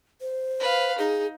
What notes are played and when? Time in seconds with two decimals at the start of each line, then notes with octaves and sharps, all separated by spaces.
0.21 C5
0.60 B4 F5
0.98 D#4 G#4